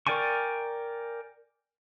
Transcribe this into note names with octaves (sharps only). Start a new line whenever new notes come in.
A#4 D5 G5 G#5 C#6